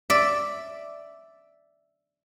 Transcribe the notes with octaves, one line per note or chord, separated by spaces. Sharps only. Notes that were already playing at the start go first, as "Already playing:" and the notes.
D5 E5